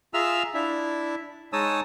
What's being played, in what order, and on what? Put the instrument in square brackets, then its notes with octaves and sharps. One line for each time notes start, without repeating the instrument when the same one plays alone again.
[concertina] F4 G#4 E5 A#5 E6 F6
D4 E4 E5
G#3 D#4 C#5 A5 D#6 E6